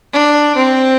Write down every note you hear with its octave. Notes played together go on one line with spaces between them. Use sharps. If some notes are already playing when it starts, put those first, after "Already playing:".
D4
C4